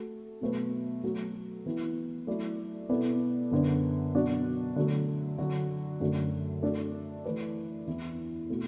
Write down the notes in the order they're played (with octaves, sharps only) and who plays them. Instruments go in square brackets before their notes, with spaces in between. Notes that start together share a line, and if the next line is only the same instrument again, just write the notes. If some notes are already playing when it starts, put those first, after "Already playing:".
Already playing: [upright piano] A3 F#4 A4
B2 F#3 A3 F#4 B4
F#3 A3 F#4
E3 B3 E4
F#3 A3 E4 D5
B2 B3 E4 A4 D5
F#2 D3 B3 D4
B2 F#3 D4 F#4
D3 F#3 A3
D3 F#3 D4 F#4
F#2 D3 F#3 A3
A3 D4 F#4 A4 D5
E3 A3 E4 B4 D5
E2 E3 B3 E4
B2 A3 F#4